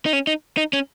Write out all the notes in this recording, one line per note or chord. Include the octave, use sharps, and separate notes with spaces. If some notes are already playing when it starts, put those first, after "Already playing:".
D#4
C#4
D#4
D#4
C#4